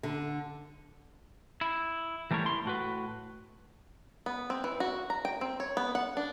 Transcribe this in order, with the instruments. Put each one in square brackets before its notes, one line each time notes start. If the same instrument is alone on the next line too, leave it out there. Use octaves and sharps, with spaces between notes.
[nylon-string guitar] D3
[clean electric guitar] E4
E3 G3 A3 A#4 C#5
E4 C6
A2 F#4 B4
[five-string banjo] B3
C4
E3
F#4
A#5
G5
C4
C#5
B3
F#5
D4